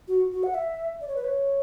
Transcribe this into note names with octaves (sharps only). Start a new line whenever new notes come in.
F#4
F#4
F#5
E5
D5
C#5
B4
C#5